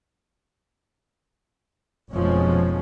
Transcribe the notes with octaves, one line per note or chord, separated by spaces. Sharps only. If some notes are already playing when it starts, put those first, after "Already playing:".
F1 F2 B2 F3 G#3 C#4